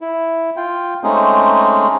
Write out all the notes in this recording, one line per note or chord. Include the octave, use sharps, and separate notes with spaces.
E4
F4 G5
G#3 A3 C4 C#4 D#4 G#4